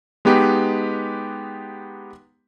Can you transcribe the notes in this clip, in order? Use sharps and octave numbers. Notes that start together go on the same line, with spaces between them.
G#3 B3 D#4 G4 B4